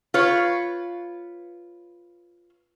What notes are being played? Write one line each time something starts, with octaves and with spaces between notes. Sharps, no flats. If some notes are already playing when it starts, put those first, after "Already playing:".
F4 B4 C#5